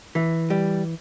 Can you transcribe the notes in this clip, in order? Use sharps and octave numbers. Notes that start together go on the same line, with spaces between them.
E3
G3